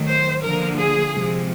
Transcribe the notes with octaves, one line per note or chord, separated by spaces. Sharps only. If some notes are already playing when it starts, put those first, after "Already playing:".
Already playing: D#3 F#3 A3
C5
D3 F3 A#3 A#4
G#4
C3 F3 G#3